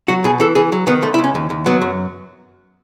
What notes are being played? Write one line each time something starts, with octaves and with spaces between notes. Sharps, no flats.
F#3 F#4
B2 G#4
E3 A4
E3 G#4
F#3
D#3 B3
C#2 A3
E4
C#2
C#4
D#2
D#2
F#3 B3
F#2